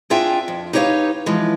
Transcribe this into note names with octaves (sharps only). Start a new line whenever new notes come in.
C4 D4 F4 G#4 E5 G5
F2
D#4 G4 B4 C#5 D#5 F5
E3 F3 G#3